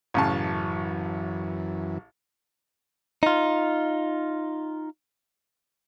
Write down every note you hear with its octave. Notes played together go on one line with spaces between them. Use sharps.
A1 F#2 C#3 E3 A5
D#4 F4